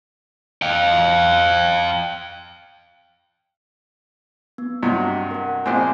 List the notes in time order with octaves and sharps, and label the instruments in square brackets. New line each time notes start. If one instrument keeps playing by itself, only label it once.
[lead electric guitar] F5 G5
[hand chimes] B3
[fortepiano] G2 C3 F#3 [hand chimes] D#5 F#5
[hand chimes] A#4 F#5
[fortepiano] A#1 G#3 C4 [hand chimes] G#5 D6